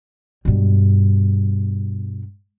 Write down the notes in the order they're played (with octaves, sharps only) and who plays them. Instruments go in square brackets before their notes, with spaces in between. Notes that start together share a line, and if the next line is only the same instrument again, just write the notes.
[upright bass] G2 B2